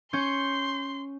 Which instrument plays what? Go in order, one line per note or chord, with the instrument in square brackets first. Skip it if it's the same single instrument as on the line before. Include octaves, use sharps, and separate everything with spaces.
[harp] C#4 G6 C#7 [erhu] C6